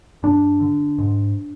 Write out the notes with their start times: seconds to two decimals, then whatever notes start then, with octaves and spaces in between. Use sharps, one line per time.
0.23 G2 D4
0.60 D3
0.98 G#2